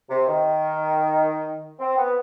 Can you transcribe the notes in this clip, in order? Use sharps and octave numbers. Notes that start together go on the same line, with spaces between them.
C3
D#3
C4
B3